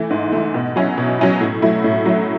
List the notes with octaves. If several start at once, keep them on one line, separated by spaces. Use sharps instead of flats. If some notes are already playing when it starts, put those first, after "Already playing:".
Already playing: E3 A3
G#2
E3 A3
B2
F#3 C#4 E4
B2
F#3 C#4 E4
A2
F#3 A3 E4
A2
F#3 A3 E4